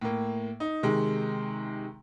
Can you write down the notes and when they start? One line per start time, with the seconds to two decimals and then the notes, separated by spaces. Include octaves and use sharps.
0.01 A2 A#3
0.60 D#4
0.83 C3 D#3 G#3